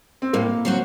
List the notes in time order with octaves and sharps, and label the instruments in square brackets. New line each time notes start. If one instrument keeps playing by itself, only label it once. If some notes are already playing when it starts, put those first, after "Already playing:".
[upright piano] C4
[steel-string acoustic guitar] A2 [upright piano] A#3
[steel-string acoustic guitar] F#3 C4 F#4